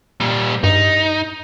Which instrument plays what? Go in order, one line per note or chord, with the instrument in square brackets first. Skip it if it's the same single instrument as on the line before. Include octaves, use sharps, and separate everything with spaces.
[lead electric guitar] A#2 G3
[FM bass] G2 [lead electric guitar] D#4